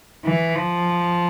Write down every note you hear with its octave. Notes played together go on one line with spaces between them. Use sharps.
E3
F3